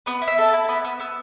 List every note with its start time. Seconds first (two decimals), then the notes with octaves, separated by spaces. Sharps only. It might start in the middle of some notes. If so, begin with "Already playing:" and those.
0.06 B3 B4
0.22 E4
0.28 E5
0.38 A4
0.48 E4 A5
0.64 A5
0.68 B3 B5
0.84 B3 E6
1.00 B3 E6